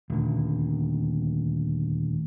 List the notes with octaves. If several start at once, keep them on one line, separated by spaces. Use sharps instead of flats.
D#1 D2